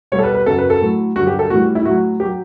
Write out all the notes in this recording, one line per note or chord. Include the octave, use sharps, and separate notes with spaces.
B2 G3 C#5
A4
B4
B4
F#2 C#3 F#3 A4
B4
A4
A2 F#3
G2 D3 F#3 F#4
G4
A4
A2 E3 G3 F#4
E4
A2 F#3 F#4
G4
F#3